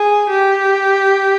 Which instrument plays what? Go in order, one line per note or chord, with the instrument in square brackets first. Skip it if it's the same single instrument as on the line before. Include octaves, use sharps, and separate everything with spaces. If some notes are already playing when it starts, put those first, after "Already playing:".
Already playing: [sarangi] G#4
G4